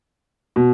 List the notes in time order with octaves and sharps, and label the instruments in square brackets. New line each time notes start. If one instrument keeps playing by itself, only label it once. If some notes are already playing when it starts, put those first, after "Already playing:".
[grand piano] B2